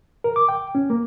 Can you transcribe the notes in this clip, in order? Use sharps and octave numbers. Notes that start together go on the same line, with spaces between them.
A#4
D6
G5
C#4
A#3